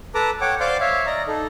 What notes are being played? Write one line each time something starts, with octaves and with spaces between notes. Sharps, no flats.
A4 B4 A5 A#5 D6
C#5 F#5 G5 D6
C5 D5 F5 C6 D6 G6
C#5 E5 F5
D5 D#5 A#5
D#4 A4